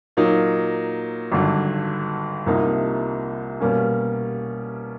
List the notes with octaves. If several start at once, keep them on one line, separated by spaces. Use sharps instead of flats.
A#2 F#3 A#3 D#4
G#1 G2 D3 F#3
C2 C3 F3 A#3 D#4
B2 G3 A#3 C#4